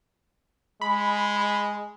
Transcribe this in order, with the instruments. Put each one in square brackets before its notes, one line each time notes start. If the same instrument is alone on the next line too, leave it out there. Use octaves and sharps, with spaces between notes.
[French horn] G#3 [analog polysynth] B5